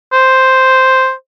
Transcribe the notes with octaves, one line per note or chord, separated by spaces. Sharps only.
C5